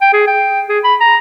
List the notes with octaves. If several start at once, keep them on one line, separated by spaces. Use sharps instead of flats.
G5
G#4
G5
G#4
B5
A#5